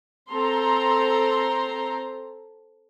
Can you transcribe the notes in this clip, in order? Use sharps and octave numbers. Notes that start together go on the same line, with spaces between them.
C4 A4 A#5 C6